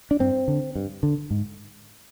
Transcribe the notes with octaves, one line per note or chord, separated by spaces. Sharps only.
D4
G2 C4
D3
G2
D3
G#2